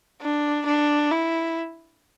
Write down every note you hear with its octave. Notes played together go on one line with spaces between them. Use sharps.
D4
D4
E4